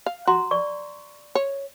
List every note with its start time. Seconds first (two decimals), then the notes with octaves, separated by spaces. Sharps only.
0.06 F5
0.27 F#4 A#5 C6
0.51 D5 C#6
1.35 C#5